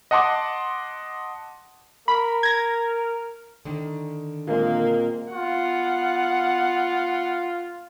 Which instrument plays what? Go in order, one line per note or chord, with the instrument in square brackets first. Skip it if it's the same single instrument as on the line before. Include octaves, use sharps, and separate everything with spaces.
[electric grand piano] D#5 F#5 A5 C6 D6
[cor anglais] A#4 [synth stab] B5
[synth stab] G#6 A#6
[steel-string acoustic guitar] D3 D#3
[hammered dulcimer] A#2 G#3 C4 [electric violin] A#3
[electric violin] B3 F#5 [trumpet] F4